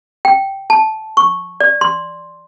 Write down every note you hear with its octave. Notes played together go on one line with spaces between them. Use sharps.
G5
A5
C#6
D5
C6